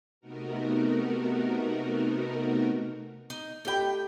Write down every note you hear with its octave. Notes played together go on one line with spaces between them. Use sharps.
C3 A3 B3 D#4 F#4 A#4
D#4
A3 D#4 G4 G5 B5